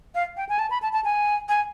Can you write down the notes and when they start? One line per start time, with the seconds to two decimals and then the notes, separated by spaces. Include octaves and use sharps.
0.15 F5
0.37 G5
0.49 G#5
0.59 A5
0.70 B5
0.82 A5
0.93 A5
1.04 G#5
1.49 G#5